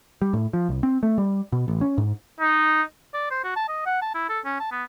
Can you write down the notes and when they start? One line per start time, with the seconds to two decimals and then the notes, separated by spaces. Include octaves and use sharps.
0.22 G3
0.33 A2
0.53 F3
0.69 C2
0.83 C4
1.03 A3
1.18 G3
1.52 B2
1.68 A1
1.81 C#4
1.98 G#2
2.40 D#4
3.14 D5
3.31 C5
3.44 F#4
3.56 A5
3.69 D#5
3.86 F#5
4.02 A5
4.14 E4
4.29 A4
4.45 C#4
4.60 A5
4.72 B3